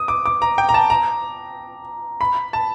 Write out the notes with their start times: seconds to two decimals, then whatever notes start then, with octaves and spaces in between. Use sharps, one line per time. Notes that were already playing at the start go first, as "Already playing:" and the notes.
Already playing: D#6
0.08 D6
0.26 D6
0.42 A#5
0.58 G5
0.69 A#5
0.74 A5
0.90 A#5
2.21 B5
2.53 A5